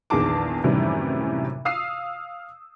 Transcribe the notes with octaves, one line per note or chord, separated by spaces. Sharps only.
A#1 E2 D#3 G#4 A5 D6
F#2 A2 C3 D#3 E3 G3
F5 D#6 E6 C7